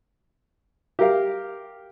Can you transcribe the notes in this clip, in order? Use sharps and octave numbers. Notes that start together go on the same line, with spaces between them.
G4 A#4 F5